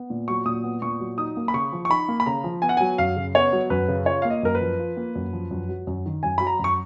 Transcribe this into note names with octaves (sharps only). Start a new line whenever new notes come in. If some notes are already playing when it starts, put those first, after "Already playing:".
Already playing: B3
A#2
F#3 C#6
A#2 D#6
B3
A#2 C#6
F#3
D#4 D#6
A#3
B5
C#3 C#6
F3
C#6
D#4 B5
A#3
B5
C#3 A#5
F3
B3 G#5
F#5
F#3 G#5
F#2 F5
C#3
B3 C#5
F#3
F#2 B4
C#3
F4 C#5
A#3 F5
D#5
F#2 A#4
B4
F3
F4
A#3
F#2
F3
F#2
F#3
F#2
D#3
F#2 G#5
F#3 B5
A#5
F#2 C#6